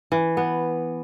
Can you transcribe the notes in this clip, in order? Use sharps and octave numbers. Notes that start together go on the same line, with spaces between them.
E3
B3